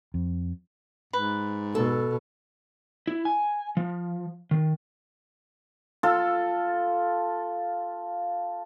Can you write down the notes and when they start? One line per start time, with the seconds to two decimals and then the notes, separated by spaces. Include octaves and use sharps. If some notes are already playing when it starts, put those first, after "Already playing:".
0.14 F2
1.13 G#2 B4
1.75 B2 A4
3.07 E4
3.25 G#5
3.77 F3
4.51 D#3
6.03 F4 A4